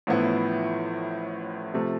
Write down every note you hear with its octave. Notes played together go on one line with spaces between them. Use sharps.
A1 A2 F3 B3 E4
C3 F3 A3